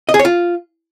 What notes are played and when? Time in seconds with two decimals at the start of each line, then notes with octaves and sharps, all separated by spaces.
0.09 D#5
0.14 G#4
0.19 C#5
0.25 F4